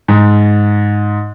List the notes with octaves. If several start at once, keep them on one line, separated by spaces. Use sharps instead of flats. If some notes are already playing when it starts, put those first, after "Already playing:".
G#2